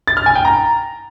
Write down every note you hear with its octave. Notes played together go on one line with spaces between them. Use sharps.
A6
F6
G#5
G5
A#5